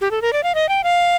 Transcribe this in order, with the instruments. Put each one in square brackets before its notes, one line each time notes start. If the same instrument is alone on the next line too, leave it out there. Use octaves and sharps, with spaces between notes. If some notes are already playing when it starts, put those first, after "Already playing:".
[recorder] G4
A4
A#4
D5
F5
D#5
G5
F5